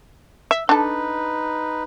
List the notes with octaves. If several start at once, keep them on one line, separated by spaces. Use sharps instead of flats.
E5
D4 D#4 A4 B4